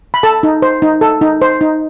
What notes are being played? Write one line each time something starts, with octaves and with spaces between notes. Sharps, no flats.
B5
A4 A5
D#4
C5
D#4
A4
D#4
C5
D#4